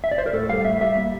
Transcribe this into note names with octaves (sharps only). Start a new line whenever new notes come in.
E5
D5
C5
A#4
A2 A4
G3 F5
A2 E5
G3 E5
A#3